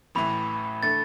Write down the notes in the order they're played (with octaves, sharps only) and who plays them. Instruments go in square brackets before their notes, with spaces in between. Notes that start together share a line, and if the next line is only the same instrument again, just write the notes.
[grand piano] A1 A2 E3 [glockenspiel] B5
[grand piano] D3 A3 [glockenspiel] A6